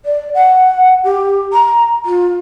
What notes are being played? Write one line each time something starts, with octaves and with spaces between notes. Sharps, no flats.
D5
F#5
G4
A#5
F4